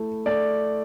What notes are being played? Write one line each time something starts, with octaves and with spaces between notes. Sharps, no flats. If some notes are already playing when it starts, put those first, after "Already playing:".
Already playing: A3 E4
A3 D5